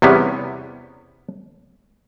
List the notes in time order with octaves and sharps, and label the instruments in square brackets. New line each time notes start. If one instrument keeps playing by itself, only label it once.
[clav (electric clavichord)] E2 C3 G3 B3 C#4